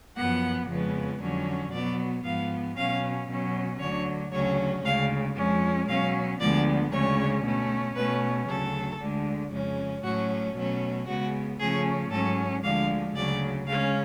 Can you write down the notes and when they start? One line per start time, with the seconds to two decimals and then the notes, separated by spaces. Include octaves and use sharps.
0.16 F#2 F3 B3 F#5
0.68 F2 C#3 F3 G#3 B3
1.20 F2 D3 F#3 C#4
1.72 B2 F#3 B3 D5
2.24 G#2 F3 B3 F5
2.77 B2 F#3 C#4 F5
3.28 B2 F#3 C#4
3.80 D2 D3 F#3 C#5
4.32 D2 C#3 F#3 C#4 C#5
4.84 D2 C#3 G#3 F5
5.36 F2 F3 G#3 C#4
5.88 B2 F#3 C#4 F5
6.40 D2 D3 F3 G#3 B3 D5
6.92 D2 C#3 G#3 C#4 C#5
7.44 B2 A3 C#4
7.96 B2 A3 C#4 B4
8.47 D2 C#3 F#3 A4
9.00 D2 D3 G#3
9.52 F2 C#3 G#3 C#4
10.04 A2 F#3 A3 C#4 F#4
10.56 B2 F#3 A3 C#4
11.08 C#3 G#3 B3 F#4
11.59 C#3 F3 A3 C#4 G#4
12.11 G#2 F#3 C#4 A4
12.63 D2 D3 F3 G#3 F5
13.15 D2 C#3 F#3 D5
13.67 C#3 G#3 C#4 F5